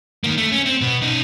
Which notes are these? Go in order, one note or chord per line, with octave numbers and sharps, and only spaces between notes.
D#3 A#3
A3
C#4
C4
B2 B3
C#4 D#4